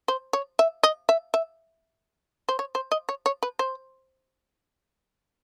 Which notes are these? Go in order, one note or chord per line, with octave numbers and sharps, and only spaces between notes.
C5
C#5
E5
D#5
E5
E5
C5
C#5
C5
D#5
C#5
C#5
B4
C5